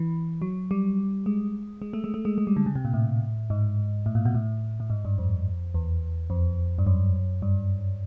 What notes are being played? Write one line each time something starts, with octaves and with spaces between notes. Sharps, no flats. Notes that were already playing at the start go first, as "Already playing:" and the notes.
Already playing: E3
F#3
G3
G#3
G#3
A3
G#3
A3
G#3
G#3
G3
D3
C#3
C3
A#2
A2
G#2
A2
A#2
B2
A2
A2
G#2
G2
F2
E2
F2
G2
F#2
G2